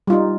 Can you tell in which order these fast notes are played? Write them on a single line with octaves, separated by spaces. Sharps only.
G3 F4 D#4